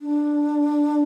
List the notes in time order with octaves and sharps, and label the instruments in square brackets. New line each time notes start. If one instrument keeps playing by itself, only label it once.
[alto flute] D4